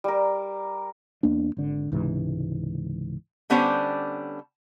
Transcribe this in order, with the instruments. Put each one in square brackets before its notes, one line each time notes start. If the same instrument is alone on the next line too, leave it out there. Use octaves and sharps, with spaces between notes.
[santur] G3 A#4
[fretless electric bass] E2 A#3 D4
G#1 D3
C#2 G#2 C3 E3
[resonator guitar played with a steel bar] D3 G3 B3 C#4 D4 C5